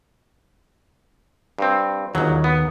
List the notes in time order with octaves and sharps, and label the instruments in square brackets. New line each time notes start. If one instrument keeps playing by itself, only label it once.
[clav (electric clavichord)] G2 C4
[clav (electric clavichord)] G1 F#3 [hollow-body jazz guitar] D#2
[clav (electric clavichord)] B3